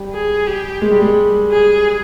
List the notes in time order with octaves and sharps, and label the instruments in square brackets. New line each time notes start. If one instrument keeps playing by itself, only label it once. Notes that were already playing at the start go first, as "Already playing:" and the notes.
Already playing: [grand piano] G3
[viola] G#4
G4
[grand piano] G#3
G3
G#3
[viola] G#4